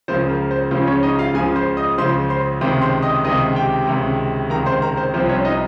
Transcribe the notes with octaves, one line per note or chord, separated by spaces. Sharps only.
C#2 C#3 F3 C5
A#4
C5
C#2 C#3 F3 C5
C#4 C#5
D#4 D#5
F4 F5
C#2 C#3 F3 G#4 G#5
C5 C6
D#5 D#6
C#2 C#3 F3 C5 C6
C5 C6
C#2 C3 D#3 C5 C6
C5 C6
D#5 D#6
C#2 C3 D#3 D#5 D#6
G4 G5
C#2 C3 D#3
C#2 C3 D#3 A#4 A#5
C5 C6
A#4 A#5
C5
C2 C3 F3 C5
C#4 C#5
D#4 D#5